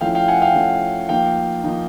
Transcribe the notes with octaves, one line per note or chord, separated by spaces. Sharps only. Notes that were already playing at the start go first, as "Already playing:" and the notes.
F3 A3 C#4 E4 F5 G5
F5 G5
F#5 G#5
F5 G5
F3 A3 C#4 E4
F3 A#3 D#4 F5 G5
F3 A#3 D#4